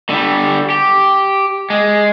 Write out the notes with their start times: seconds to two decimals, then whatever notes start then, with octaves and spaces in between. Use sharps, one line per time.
0.09 D3 G3
0.70 G4
1.70 G#3